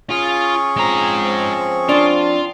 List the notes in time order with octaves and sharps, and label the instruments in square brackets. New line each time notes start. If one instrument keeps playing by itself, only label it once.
[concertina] C#4 G#4 C#6 [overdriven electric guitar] F4
[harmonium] F3 C4 [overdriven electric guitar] G#3 A#5
[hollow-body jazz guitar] D4 [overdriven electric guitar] F4